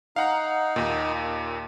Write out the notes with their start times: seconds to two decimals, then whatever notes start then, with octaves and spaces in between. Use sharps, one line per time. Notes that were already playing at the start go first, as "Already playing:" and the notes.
0.16 D#4 F5 F#5 A#5
0.76 D#2 A#2